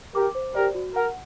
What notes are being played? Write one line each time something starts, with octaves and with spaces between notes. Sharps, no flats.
G4 A#4 D6
C5
G4 A#4 D5
F#4
A#4 F#5